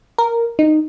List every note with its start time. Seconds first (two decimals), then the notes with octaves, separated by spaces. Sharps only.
0.18 A#4
0.59 D#4